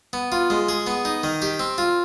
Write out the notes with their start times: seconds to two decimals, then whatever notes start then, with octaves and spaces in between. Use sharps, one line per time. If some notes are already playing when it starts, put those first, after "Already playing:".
0.13 B3
0.32 F4
0.50 G#3
0.69 G#4
0.87 B3
1.05 D#4
1.23 D#3
1.42 G4
1.60 C4
1.78 F4